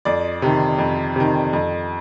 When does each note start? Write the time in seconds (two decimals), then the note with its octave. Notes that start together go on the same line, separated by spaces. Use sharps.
0.05 F2 D5
0.42 C3 D#3
0.79 F2
1.16 C3 D#3
1.53 F2